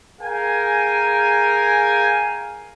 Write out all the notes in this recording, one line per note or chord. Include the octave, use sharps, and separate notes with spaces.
G#4 A#4 F5 G5 G#5